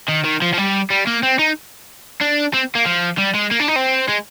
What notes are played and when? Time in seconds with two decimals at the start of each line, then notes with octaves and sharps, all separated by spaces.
0.09 D#3
0.25 D#3
0.42 F3
0.53 F3
0.58 G3
0.90 G3
1.07 A#3
1.23 C4
1.39 D#4
2.21 D4
2.54 C4
2.75 A#3
2.86 F3
3.18 G3
3.34 G#3
3.51 A#3
3.60 D4
3.68 D#4
3.76 C4
4.08 G#3